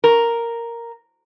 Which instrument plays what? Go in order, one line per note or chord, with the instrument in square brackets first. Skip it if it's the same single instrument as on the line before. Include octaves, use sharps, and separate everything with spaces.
[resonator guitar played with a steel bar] A#4